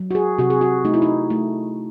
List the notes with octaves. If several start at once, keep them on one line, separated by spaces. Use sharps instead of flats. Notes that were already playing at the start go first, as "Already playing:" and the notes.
Already playing: F#3
F#4
G#4
C3 F#4
G#4
F#4
A3 D#4
E4
D#4
A3